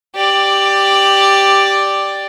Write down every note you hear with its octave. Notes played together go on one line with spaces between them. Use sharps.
G4 D5